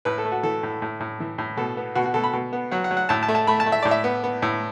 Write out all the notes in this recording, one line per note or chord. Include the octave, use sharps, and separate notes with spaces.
A2 B4
A4
A3
F#4
E3 A4
A2
A2
A2
E3
A2
B2 A4
B3
B2 F#4
F#4
B2 A4
B5
B2
B3
F#3 F#5
F#5
F#3
F#5
A2 A5
A5
A3
A5
A3 B5
A5
A3
E5
A2 D5
E5
B3
B3
A2